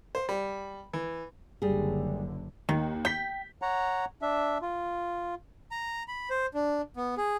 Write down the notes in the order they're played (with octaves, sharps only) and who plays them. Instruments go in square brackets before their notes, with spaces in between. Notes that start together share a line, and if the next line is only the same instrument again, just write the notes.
[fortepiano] C5
G3
E3
[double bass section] F#1 D3 [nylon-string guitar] G3 G#4
[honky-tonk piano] D#2 A#3 [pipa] D#3
[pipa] G5 [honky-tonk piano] G6 B6
[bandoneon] C#5 F#5 A#5
D4 E5
F4
[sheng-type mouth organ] A#5
B5
C5
D4
B3
G#4